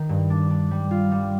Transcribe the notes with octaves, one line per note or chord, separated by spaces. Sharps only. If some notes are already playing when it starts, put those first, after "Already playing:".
Already playing: D#3
G2
D4
D4
G3
F4
G3